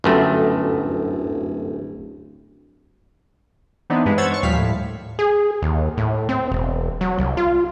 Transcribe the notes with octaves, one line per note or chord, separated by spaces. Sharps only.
D1 G1 F#2 A3
E3 B3 C4 D4 D#4
G2 G#3 B4
C5 C#5 F#5 E6 G#6 A6
C#5 C#6
D#2 A#2 F3 G3 F5 B6
A2
G#4
D#2
A2
C4
E1
F#3
C2
F4